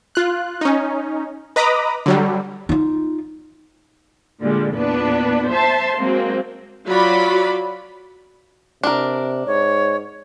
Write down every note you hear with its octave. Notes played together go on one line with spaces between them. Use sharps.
F4 F#6
C#4 D#4
B4 D#5 A#5 B5 D6 D#6
D3 F#3 G3
D#4 F4
A#2 D3 G3 G#3
E2 A#2 B3 D4 B4
C5 E5 A5 C6
F#3 G#3 A#3 C4
F#3 F4 F#4 D5 B5
C3 D4 A#4
G#2 C#5